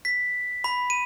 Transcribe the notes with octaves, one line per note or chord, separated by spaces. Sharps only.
B6
B5
D#7